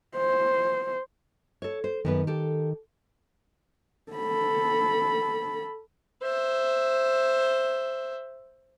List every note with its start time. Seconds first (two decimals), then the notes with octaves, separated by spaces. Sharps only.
0.16 C5
1.62 A4 C#5
1.84 C5
2.05 F#2 D#3 B3 B4
2.27 G4 A4
4.12 A4 B5
6.22 C5 E5